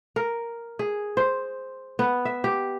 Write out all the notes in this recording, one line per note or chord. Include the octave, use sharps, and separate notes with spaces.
A#4
G#4
C5
B3
E5
G4